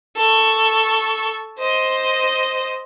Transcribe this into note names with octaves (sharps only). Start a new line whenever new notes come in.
A4 C#6
C5 D#5